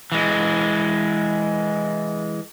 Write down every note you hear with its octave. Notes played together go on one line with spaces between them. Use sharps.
E3 G#3